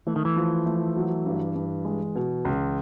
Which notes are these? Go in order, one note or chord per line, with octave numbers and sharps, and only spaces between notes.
E3 A3
D#3
E3
F3
A3
F#3
G2
G2
G#3
B2
C#2